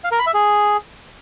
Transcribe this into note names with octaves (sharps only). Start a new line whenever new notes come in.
F5
A#4
B5
E5
G#4